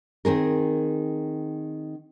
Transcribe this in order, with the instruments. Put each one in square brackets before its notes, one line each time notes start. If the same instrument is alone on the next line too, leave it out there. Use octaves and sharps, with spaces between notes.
[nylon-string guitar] D#3 C4 G#4 A#4